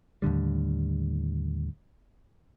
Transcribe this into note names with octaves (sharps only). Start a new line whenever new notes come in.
D#2 A2 D3 G3